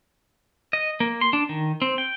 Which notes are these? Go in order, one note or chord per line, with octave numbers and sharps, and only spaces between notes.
D#5
A#3
C6
D4
D#3
C4
G5